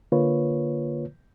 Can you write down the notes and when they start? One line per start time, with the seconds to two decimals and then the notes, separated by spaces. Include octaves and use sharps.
0.12 D3 A#3 F4 B4 C#5